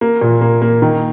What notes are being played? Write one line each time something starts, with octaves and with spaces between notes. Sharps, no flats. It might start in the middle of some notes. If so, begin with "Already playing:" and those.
A#3
A#2
A#3
A#3
D#3